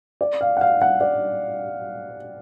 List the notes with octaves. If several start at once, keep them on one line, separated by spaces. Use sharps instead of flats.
D5
F5
F#5
F5
F#5
D5